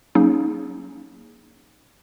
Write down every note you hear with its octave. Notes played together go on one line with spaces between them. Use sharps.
F#3 A#3 C#4 D#4 G#4